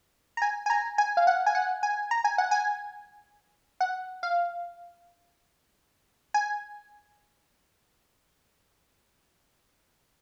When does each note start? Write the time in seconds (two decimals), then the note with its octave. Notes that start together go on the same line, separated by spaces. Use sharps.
0.37 A#5
0.42 G#5
0.66 G#5
0.70 A#5
0.98 G#5
1.17 F5
1.27 F#5
1.46 G#5
1.55 F#5
1.83 G#5
2.11 A#5
2.24 G#5
2.38 F#5
2.51 G#5
3.81 F#5
4.23 F5
6.34 G#5